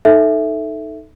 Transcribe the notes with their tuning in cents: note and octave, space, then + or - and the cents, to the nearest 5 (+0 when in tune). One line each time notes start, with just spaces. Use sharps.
D#4 +0 A4 +0 E5 +0